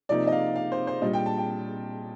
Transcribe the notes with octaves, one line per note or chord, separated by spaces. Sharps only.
C3 F3 A#3 D#4 D5
D#5
F5
F5
C5
C5
A#2 G3 D4 D#5
G5
A5
G5